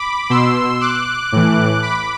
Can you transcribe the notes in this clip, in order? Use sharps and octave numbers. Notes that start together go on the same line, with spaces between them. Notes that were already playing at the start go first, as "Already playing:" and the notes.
Already playing: B5 D6
B2 C6 E6
D6 F#6
A2 E3
B5 D6